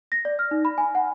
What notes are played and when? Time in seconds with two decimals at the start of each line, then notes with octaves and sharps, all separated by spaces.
0.12 A#6
0.25 D5
0.39 F6
0.51 D#4
0.65 B5
0.78 G#5
0.95 F#5